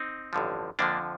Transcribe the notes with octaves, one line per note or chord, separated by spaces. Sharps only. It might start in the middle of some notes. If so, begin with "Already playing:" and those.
Already playing: C4 D#4
A1 G2 D3 F3
F2 D3 F3 A#3 D4